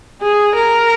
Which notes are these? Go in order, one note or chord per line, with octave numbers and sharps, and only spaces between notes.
G#4
A#4